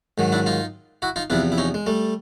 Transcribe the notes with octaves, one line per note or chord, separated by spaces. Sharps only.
G#2 D#3 F#3
D4 E4
D#4 F4
E4 F#4
D#4 F4
E2 C3 F3 D4 E4
E4
C#4 D#4
G#3
G3 A3